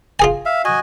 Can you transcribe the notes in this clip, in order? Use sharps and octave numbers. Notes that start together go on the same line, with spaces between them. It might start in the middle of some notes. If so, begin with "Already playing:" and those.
F4 G#4 G#5
E5 F5
F#4 D#5 G#5